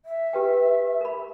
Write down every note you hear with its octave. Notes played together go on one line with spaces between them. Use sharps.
E5
G4 B4 G5
A#4 B5